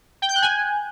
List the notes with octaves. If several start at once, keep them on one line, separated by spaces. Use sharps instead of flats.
G5
G6
F#6
G#5